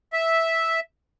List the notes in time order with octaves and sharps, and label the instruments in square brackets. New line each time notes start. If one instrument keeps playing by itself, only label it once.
[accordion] E5